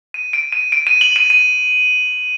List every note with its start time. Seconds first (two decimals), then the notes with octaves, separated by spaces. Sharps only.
0.14 D#7
0.33 D7
0.52 D#7
0.72 D7
0.87 D#7
1.01 F#7
1.16 D#7
1.30 D#7